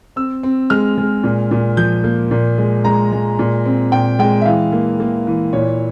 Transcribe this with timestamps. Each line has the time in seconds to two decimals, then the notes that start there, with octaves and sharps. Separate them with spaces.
0.16 C4 E6
0.43 C4
0.70 G#3 F6
0.98 G#3
1.24 A#2
1.51 A#2
1.77 F3 G6
2.04 A#3
2.31 A#2
2.58 G#3
2.84 G#3 A#5
3.12 G#3
3.39 A#2
3.65 C4
3.92 A#2 G5
4.19 G#3 G5
4.41 E5
4.45 E3 F5
4.72 A#3
5.00 A#3
5.27 E3
5.53 A#2 C#5